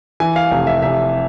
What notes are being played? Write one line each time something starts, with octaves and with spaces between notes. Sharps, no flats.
E3 G#5
F5
F1
E5
F1 E5